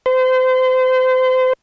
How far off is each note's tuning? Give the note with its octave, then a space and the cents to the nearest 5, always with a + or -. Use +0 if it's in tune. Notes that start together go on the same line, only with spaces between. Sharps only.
C5 -30